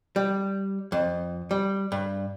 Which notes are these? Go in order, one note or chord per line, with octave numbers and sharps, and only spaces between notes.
G3
F2
G3
G2